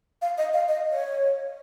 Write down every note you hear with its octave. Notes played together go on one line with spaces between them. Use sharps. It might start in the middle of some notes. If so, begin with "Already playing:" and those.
F5
D#5
F5
D#5
C#5